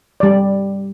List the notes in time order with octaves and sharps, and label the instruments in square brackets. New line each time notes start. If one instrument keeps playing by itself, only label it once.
[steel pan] G3 D5